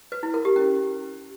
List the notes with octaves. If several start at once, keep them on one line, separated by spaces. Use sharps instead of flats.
B4
E4
A#4
G4
C#4